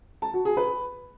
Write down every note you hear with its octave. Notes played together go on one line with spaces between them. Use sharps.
A5
F#4
G#4
B4